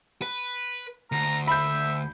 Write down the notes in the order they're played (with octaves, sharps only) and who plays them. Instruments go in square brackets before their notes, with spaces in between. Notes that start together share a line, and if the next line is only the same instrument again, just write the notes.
[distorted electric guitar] B4
[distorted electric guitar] D2 [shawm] A#5
[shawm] E5 [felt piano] B5 G6